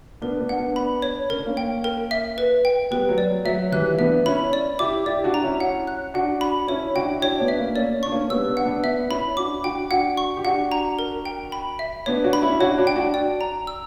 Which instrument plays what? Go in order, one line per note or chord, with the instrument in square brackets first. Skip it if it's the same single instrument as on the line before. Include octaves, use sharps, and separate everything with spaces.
[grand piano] B3 D4 [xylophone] A#4
[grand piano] B3 D4
[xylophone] F#5
[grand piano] B3 D4
[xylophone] B5
C#5
[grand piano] C#4 [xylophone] A#4
[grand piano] D4
A#3 C#4
[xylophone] G5
A#4
E5
B4
G5
[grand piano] G3 B3 [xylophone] B4
[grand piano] F#3
[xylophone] D5
[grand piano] F#3 [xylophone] E5
[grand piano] E3 G3 [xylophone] F#6
[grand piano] E4
[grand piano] B3 D4 [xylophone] E5
[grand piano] C#4 E4 [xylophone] B5
[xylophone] D5
[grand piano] E4 G4 [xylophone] D6
[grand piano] E4 G4 [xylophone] D5
[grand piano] D4 F#4
[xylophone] A#5
[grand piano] C#4 E4
[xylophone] F#5
F#6
[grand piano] D4 F#4 [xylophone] F#5
[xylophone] B5
[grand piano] C#4 E4 [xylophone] C#5
[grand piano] D4 F#4 [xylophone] G5
[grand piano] E4
[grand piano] D4 F#4 [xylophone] C#5
[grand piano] B3 D4
[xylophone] E5
[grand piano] A#3 C#4
[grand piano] A#3 C#4 [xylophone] D5
[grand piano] D4 [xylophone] C#6
[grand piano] A#3 C#4
[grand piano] G3 B3 [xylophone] E6
[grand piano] B3 D4
[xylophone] F#5
[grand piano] B3 D4
[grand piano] B3 D4 [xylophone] E5
[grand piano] C#4 E4 [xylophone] B5
[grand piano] D4 F#4 [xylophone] D6
[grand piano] D4 F#4 [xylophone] G5
[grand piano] D4 F#4 [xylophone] F#5
[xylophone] C#6
[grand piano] G4
[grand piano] D4 F#4 [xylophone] F#5
[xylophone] A#5
A#4
G5
B5
E5
[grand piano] B3 D4 [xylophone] C#5
[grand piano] D4 F#4
[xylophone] B5
[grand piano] C#4 E4
[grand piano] D4 F#4 [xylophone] C#5
[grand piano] D4 F#4
[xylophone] G5
[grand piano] D4 F#4
[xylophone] D5
A#5
E6